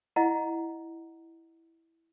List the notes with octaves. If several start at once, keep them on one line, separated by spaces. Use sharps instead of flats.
E4 D#5 F#5 A#5